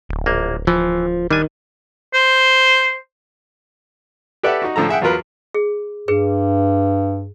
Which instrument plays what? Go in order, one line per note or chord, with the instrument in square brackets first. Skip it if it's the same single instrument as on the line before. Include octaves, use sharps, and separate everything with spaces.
[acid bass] D1
[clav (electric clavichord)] A#1 A#3
[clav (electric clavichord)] E3 [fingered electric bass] F3
[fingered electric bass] D#3 [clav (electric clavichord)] G3 D4 G#5
[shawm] C5
[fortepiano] G4 A4 B4 D5 E5 F#5
D#4 F#4
A2 D3 F3 A4 A#5
G#4 E5 F#5 G5
E2 F#3 F4 A#4 B4
[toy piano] G#4
[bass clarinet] G2 [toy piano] G#4 B4